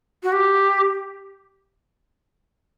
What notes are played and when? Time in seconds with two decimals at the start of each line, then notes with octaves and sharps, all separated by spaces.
0.23 F#4
0.33 G4